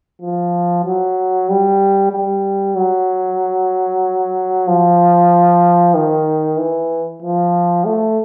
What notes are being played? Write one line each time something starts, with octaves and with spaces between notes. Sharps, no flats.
F3
F#3
G3
G3
F#3
F3
D#3
E3
F3
A3